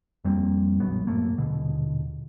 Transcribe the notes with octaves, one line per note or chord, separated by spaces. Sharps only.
F2 G3 A#3 C4
D1 A#1 F#3 B3
D1 F#2 A3 A#3
D#1 B2 D3